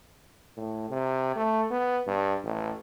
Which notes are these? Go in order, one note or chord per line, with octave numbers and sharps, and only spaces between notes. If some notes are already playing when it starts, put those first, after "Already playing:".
A2
C3
A3
B3
G2
A1